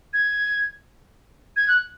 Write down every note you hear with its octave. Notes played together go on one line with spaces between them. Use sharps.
G#6
G#6
F#6